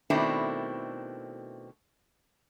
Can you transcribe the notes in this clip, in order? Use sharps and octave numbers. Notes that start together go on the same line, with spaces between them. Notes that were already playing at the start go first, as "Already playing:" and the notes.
B2 D#3 A3 C4 D4 E4